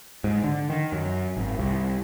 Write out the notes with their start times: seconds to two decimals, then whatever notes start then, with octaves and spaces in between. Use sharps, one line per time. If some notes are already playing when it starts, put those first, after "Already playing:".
0.24 G#2
0.44 D3
0.70 D#3
0.92 F#2
1.37 G#1
1.59 C2